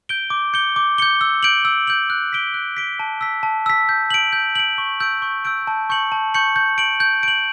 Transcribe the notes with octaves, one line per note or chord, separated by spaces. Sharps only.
G6 D7 G7
D6
G6 C#7 G7
D6
G6 C#7 G7
E6
G6 D7 F#7
E6
G6 D7 F#7
F#6
B6 D7 G7
F#6
B6 D7 G7
A5
E6 B6
A5
E6 B6
G6
D7 F#7
G6
D7 F#7
C#6
E6 G6 D7
C#6
E6 G6 D7
A5
C#6 G6 C#7 F#7
A5
C#6 G6 C#7 F#7
G6
D7 F#7
G6
D7 F#7